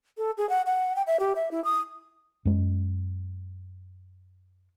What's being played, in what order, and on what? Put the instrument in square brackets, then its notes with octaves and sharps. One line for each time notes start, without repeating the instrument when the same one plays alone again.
[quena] A4
G#4
F#5
F#5
G5
E5
G4
E5
E4
D#6
[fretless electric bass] F#2 G#3